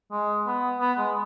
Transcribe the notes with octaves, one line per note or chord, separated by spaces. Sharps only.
G#3
B3
B3
G#3